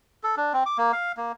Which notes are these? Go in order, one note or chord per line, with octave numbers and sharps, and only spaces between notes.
A4
D4
C4
D6
A#3
F5
A#3